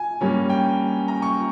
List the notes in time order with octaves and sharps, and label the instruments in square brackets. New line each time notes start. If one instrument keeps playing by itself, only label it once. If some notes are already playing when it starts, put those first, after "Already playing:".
Already playing: [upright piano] G#5
G2 G3 A#3 C#4
G5
A#5
C#6